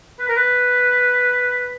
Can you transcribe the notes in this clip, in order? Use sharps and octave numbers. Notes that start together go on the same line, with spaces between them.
B4
A#4
B4